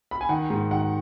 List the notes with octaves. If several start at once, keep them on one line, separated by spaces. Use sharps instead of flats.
B5
G#5
D#3 F#5
G#2
D#3 F#5